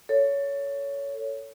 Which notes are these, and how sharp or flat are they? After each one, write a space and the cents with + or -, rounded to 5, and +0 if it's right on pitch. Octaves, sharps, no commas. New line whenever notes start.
A4 +20 C#5 +15